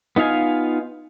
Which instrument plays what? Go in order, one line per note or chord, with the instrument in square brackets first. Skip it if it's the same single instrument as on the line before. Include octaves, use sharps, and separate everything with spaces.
[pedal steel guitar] B3 D#4 F4 F5 G#5